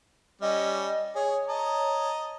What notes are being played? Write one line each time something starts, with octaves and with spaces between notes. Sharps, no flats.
G3 C#4 D#5
G#4 C#5
D#5 A5 A#5